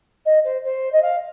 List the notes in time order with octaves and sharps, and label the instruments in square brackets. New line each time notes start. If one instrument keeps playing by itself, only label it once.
[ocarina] D#5
C5
C5
D#5
F5